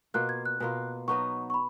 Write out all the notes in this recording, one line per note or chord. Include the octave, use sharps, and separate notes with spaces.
B2 A#3 F4 F#6
G#6
F#6
B2 A#3 F4
F#3 B3 D#4 F#4 C#6
C#6
B5